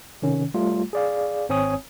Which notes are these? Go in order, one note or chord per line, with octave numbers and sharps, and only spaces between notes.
C3 D#3 C#4
G3 A3 F4
G#4 D5 F5
G#1 C4 C#5 G#5 D#6